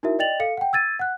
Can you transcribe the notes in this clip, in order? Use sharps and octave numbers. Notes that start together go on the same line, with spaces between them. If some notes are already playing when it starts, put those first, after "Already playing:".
D#4 E4 F#4 A#4 E5
D5 D#5 G5 A6 F7 F#7
A4 F5 C#7
F#5 G5
E6 G#6 A6 D#7
F#5 F#6